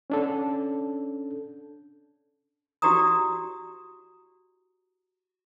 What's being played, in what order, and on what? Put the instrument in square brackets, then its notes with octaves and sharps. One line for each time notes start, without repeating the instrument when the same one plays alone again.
[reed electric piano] C#4 D4 A4
[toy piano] E4 F#4 G4 D5 A#5 D#6